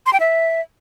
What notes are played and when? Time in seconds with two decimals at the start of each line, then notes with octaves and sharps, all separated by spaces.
0.06 C6
0.13 G5
0.20 E5